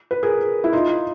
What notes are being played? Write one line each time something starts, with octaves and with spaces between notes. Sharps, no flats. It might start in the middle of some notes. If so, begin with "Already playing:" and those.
B4
G#4 A#4
E4
D#4 F4